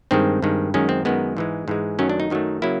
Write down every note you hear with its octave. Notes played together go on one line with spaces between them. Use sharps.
G2 D#3 G#3 C4
G2 D#3 G#3
F#2 D#3 G#3 C#4
C4
F#2 D#3 G#3 B3
G#2 E3 G#3
G#2 E3 G#3
F#2 D#3 F#3 A3 C#4
D4
D#4
F#2 D#3 F#3 A3
C#3 F#3 A#3 E4